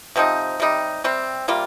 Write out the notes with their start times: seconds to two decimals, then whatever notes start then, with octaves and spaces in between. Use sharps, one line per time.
0.16 C3 F3 C4 D#4
0.60 C3 G3 D#4
1.04 C3 G3 C4
1.48 C3 G3 A#3 F4